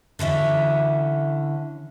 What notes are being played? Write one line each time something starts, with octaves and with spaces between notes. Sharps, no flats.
D3 E3 C#4 E5